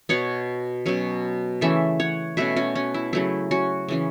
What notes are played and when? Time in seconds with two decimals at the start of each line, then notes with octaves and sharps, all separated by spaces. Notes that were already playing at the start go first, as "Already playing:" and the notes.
0.09 B2 B3 C#5 F#5
0.86 B2 F#3 C#4
1.61 C#3 E3 A3 C#4 E5 A5
2.00 C#5 F#5
2.37 B2 A3 C#4 B4 E5
2.56 C#4 F#4
2.75 C#4
2.94 E4
3.13 C#3 F#3 A3 E4
3.51 C#4 F#4
3.88 C#3 E3 C#4